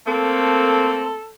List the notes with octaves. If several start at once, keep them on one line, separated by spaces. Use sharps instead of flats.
A3 A#3 C4 A4